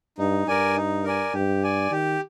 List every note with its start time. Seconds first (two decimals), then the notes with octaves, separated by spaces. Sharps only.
0.18 G2 D#4
0.47 G2 A#4 D5 G#5
0.76 D#4
1.04 A#4 D5 G#5
1.34 G2 G4
1.63 D5 G#5
1.91 D#3 G4